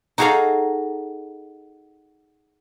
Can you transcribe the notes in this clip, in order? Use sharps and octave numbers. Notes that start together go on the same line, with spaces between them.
D#4 F#4 G#4 A4 F5 A#5